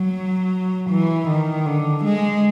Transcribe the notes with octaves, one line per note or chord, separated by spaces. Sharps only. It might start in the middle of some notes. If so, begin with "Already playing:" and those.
Already playing: F#3
E3
D#3
D3
G#3